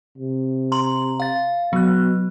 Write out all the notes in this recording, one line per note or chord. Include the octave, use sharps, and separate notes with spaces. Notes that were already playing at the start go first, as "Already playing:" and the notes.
C3
A#5 C6 F#7
F5 A6
B2 F#3 F#6